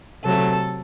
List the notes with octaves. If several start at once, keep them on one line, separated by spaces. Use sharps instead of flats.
C3 F#3 A3 A4